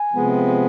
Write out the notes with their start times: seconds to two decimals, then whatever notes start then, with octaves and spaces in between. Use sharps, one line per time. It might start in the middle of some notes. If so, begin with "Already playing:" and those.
Already playing: G#5
0.13 C3 F3 G#3 B3